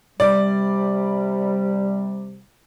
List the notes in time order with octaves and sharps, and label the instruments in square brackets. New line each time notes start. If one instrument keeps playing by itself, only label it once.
[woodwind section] C3 G3 [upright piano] D5